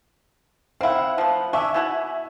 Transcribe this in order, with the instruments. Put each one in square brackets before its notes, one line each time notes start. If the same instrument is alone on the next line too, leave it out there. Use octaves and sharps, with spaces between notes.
[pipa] C4 E4 [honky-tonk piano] F5 F#5
[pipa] F3 A3 B3
[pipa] D4 [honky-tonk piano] E5 G#5 C#6
[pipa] B2 E4 F#5